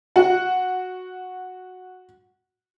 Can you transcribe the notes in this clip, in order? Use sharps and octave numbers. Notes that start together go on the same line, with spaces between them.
F#4 F#5